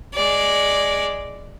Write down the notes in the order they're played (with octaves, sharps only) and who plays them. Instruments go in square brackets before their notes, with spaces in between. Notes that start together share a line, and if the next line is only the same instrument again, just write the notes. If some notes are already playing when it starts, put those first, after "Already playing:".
[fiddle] G#3 D5